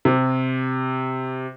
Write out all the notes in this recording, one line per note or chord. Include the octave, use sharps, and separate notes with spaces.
C3